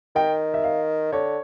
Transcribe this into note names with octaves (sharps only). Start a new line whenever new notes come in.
D#3 G5
E5
F5
D3 C#5